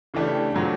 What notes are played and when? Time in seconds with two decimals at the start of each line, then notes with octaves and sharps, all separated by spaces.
0.14 C#3 E3 A3 D4 G4
0.54 A#2 F#3 A3 C4